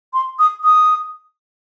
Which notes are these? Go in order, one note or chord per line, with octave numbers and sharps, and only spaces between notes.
C6
D#6
D#6